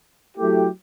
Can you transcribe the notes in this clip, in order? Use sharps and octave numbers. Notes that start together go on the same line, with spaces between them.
F#3 A3 E4 G4